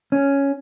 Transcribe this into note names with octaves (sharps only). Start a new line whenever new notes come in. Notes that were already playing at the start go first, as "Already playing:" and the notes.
C#4